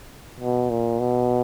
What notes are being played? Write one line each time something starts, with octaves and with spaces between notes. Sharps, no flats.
B2
A#2
B2